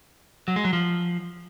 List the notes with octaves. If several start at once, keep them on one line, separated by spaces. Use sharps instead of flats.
F#3
G#3
F#3
F3